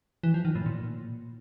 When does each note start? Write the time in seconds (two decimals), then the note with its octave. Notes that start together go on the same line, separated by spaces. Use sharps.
0.23 E3
0.34 F3
0.45 D#3
0.55 A2
0.66 A#2